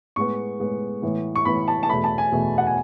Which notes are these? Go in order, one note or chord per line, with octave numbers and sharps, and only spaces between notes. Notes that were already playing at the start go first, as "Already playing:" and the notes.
A2 G#3 B3 C#6
A2 G#3 B3
A2 E3 B3
C#6
A2 E3 B3 B5
A5
A5
E2 B2 A3 B5
A5
G#5
E2 B2 A3
F#5
G#5